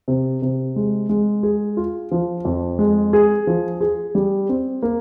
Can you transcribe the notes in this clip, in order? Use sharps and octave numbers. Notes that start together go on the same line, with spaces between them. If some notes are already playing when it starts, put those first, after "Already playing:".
C3
C3
G#3
G#3
G#4
F4
F3
F2
G#3
G#4
F3
G#4
G3
C4
A#3